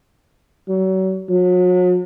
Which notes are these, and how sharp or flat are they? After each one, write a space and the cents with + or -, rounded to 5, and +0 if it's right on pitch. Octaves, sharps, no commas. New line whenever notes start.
F#3 +35
F#3 -40